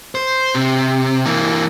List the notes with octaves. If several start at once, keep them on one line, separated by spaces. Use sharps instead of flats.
C5
C3
E3 A#3